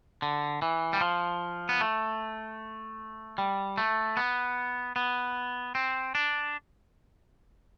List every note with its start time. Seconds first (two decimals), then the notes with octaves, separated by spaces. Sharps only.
0.22 D3
0.62 E3
0.93 G3
1.01 F3
1.69 B3
1.81 A3
3.38 G3
3.78 A3
4.17 B3
4.96 B3
5.75 C4
6.15 D4